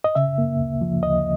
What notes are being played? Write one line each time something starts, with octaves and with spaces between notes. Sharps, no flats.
D#5
C#3 E5
A#3
D2
F3
D2 D#5